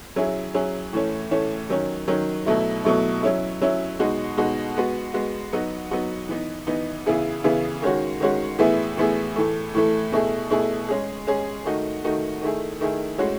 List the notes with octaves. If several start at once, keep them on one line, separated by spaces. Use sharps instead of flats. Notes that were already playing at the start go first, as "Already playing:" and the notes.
F#3 C#4 E4 G#4
F#3 C#4 E4 G#4
A2 E3 A3 C#4
A2 E3 A3 C#4
D#3 F#3 C#4
D#3 F#3 C#4
B2 F#3 A3 E4
B2 F#3 A3 E4
F#3 C#4 E4
F#3 C#4 E4
B2 G#3 D#4 F#4
B2 G#3 D#4 F#4
G#3 B3 F#4
G#3 B3 F#4
F#3 B3 D#4 F#4
F#3 B3 D#4 F#4
E3 B3 D#4
E3 B3 D#4
C#3 E3 B3 E4 G#4
C#3 E3 B3 E4 G#4
D#3 G#3 C#4 F#4
D#3 G#3 C#4 F#4
A2 E3 B3 E4 G#4
A2 E3 B3 E4 G#4
A2 E3 A3
A2 E3 A3
B2 A3 E4 G#4
B2 A3 E4 G#4
G#3 C#4 G#4
G#3 C#4 G#4
D#3 A3 D#4 F#4
D#3 A3 D#4 F#4
D#3 A3 E4 G#4
D#3 A3 E4 G#4
A2 G#3 C#4 F#4